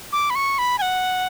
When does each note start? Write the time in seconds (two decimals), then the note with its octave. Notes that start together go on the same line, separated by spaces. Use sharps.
0.13 D6
0.30 B5
0.35 C#6
0.59 B5
0.78 G#5
0.82 F#5